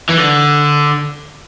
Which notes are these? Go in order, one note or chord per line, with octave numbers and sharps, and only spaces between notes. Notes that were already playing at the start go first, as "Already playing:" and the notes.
E3
D3